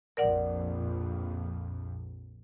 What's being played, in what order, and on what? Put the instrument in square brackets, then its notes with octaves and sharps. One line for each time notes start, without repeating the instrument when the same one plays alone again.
[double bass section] A#1 F2 [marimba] A#4 D5 F#5